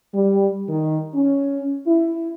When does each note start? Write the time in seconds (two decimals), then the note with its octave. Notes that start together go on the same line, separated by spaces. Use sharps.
0.15 G3
0.70 D#3
1.15 C#4
1.88 E4